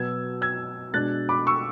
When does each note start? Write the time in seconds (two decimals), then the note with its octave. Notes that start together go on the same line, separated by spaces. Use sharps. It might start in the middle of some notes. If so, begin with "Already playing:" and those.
Already playing: B2 F#3 B3 E6 G#6
0.42 E6 G#6
0.94 B2 G#3 D4 F#6 A6
1.29 B5 D6
1.47 C#6 E6